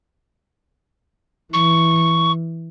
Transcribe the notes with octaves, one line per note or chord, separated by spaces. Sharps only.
E3 C#6